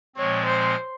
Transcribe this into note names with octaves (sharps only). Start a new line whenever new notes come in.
A#2 F3 G#3 C4 C#5
C5